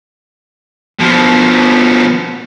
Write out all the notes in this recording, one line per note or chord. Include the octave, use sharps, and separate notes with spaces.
B2 F3